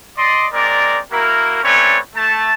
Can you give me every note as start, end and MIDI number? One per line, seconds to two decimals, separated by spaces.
0.18 0.47 74
0.18 0.47 75
0.18 0.47 84
0.53 0.99 56
0.53 0.99 60
0.53 0.99 70
0.53 0.99 74
1.12 1.62 58
1.12 1.62 64
1.12 1.62 66
1.12 1.62 70
1.64 1.98 57
1.64 1.98 60
1.64 1.98 61
1.64 1.98 71
1.64 1.98 73
1.64 1.98 74
2.16 2.53 57
2.16 2.53 81